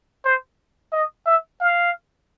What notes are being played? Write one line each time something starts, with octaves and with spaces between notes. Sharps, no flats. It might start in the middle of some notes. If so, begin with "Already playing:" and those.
C5
D#5
E5
F5